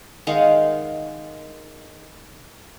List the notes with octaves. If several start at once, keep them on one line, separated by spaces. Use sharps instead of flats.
D#3 G#3 F5 F#5